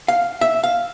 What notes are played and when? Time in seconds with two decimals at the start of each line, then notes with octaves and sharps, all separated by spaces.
0.08 F5
0.41 E5
0.64 F5